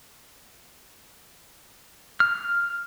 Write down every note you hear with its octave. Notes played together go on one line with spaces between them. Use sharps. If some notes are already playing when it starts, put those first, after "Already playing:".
F6